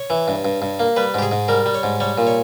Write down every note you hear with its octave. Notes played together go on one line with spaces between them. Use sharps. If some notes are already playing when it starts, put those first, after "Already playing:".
Already playing: C#5
E3
G2
G2
G2
A#3
G3 B4
G#2 G4
G#4
G#2
G3 A#4
G3
C#5
G#2
G3 C#5
A#2
C#5